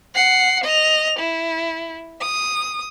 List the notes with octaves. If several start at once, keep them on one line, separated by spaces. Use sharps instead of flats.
F#5 C7
D#5 F7
E4
D#6